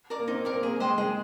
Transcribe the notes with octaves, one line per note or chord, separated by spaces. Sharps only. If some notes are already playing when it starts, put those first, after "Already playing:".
A#4 D5
A#3
C4 D#4
A#3
C4 A#4 D5
A#3 G#4
G#3 C5 D#5 G5
G#3 G#4